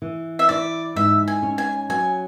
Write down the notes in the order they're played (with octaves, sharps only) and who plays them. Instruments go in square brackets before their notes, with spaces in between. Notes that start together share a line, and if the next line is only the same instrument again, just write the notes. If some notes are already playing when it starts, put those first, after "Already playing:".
[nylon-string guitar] E3
[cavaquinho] E5
[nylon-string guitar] E4 [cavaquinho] D5
[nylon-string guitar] G#2 [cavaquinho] E5
[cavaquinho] G#5
[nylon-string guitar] C#4
[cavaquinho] G#5
[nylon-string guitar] F#3 [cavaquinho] G#5